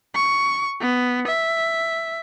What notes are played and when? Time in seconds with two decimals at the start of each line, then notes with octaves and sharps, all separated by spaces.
0.15 C#6
0.81 B3
1.27 E5